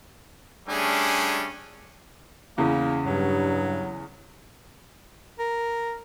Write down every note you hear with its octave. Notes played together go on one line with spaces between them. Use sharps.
G3 A3 C#4 D4 G#4
E2 C#3 A#3
G2 F#3
A#4